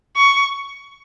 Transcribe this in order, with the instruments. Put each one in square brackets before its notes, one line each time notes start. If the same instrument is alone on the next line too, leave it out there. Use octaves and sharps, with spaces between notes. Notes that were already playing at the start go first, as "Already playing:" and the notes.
[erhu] C#6